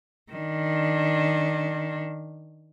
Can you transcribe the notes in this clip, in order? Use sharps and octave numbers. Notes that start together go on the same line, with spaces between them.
D#3 D4